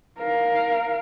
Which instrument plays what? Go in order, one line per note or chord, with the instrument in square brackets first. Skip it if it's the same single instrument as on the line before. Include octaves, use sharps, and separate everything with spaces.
[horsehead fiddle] A#4 F5